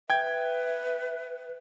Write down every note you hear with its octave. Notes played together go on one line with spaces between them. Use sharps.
B4 E5 G5 G#6